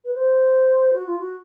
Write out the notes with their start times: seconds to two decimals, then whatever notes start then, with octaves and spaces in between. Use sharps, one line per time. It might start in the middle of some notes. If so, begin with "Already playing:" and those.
0.04 B4
0.14 C5
0.93 F#4
1.06 F4
1.19 F#4